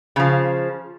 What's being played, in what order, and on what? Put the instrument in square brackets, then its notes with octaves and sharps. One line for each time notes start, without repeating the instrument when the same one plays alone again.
[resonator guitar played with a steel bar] C#3 F3